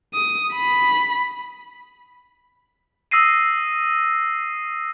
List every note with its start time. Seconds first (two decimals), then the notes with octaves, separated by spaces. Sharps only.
0.14 D#6
0.54 B5
3.11 D#6 E6 A#6 C7 D#7